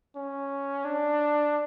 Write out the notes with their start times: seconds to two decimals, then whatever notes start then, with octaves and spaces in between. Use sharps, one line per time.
0.15 C#4
0.85 D4